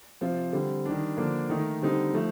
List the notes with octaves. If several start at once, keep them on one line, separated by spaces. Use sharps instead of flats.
C3 F3 C4 F4
D3 G3 C4
D#3 G3 D4
D3 F3 A#3 D4
D#3 A3 D#4
D3 G3 C4 D#4
F3 A3